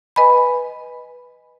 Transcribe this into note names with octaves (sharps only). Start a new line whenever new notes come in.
B4 D#5 G#5 B5